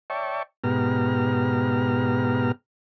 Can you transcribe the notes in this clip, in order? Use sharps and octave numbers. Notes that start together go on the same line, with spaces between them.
C#5 D5 E5 G5 A5 C#6
G#2 B2 B3 G4 A#5 F6